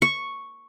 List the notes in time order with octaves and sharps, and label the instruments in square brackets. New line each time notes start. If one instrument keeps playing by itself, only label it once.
[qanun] C#6